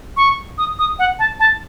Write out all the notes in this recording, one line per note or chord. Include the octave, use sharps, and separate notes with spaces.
C#6
D#6
D#6
F#5
A5
A5